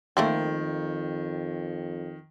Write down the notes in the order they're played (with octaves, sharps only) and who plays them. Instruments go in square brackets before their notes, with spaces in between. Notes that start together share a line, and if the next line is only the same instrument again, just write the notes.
[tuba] F2 [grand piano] D#3 [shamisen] A3 A#3 C4